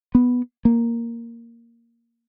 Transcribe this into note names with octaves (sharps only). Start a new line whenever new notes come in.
B3
A#3